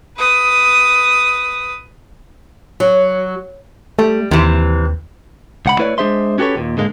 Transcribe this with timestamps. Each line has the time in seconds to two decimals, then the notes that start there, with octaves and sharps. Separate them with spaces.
0.17 B4 D#6
2.80 F#3
3.99 G3 A3
4.31 D#2 C3 E3
5.66 C#2 F#5 B5
5.79 A3 E4 B4 C#5 D5
5.98 G#3 D4 G#4 C5 E5 C6
6.38 C#4 F#4 G4 A4 B4 C#5
6.56 D#2 A#2
6.77 G#2 D3 G#3 A#3